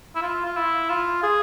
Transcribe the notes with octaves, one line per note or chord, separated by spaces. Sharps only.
E4
F4
F4
E4
F4
G#4